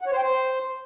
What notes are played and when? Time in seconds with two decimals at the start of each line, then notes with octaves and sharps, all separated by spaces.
0.01 F#5
0.07 C#5
0.12 C5
0.17 G5
0.23 C5